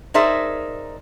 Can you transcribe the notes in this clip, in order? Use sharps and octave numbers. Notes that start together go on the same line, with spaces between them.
D#4 G#4 A#4 C5 D5 E5